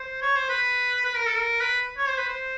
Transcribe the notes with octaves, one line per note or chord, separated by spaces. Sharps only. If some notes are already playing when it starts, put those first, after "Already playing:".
Already playing: C5
C#5
C5
B4
B4
A#4
A4
A#4
B4
C#5
C5
B4
C5